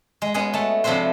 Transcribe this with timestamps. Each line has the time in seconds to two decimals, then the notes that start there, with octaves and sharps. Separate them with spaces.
0.22 G#3
0.34 G#3 B3 C#4 F#4 G#4
0.54 A3 A5
0.84 C3 F3 D4 E4 F#4 C5